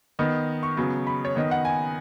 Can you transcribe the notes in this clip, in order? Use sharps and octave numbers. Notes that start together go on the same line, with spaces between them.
D#3 B3 D#5
C#6
C#3 F#3 B3
B5
C#5
D#3 B3 D#5
F#5
G#5